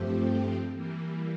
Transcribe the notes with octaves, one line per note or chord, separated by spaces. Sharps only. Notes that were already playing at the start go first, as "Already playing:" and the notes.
Already playing: G2 F3 A3 C4 G4
E3 G3 A#3